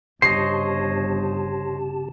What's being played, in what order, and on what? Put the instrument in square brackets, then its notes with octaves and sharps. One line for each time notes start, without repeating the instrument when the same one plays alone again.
[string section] G1 [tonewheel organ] C#3 G4 A5 [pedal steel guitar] C5 C#5 D#5 [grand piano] C7